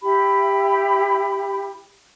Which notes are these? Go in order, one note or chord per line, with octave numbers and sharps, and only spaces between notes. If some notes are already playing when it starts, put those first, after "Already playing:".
E4 G4 B5